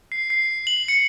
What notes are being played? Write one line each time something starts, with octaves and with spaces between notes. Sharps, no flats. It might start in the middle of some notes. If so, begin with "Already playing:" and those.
C7
C7
F#7
C#7